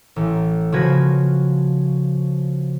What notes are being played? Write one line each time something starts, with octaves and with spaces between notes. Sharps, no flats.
A1
C#3 F3 F#4 B4 G#6 A#6